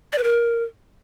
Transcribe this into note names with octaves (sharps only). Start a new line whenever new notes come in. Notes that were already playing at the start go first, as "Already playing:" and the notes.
D5
B4
A#4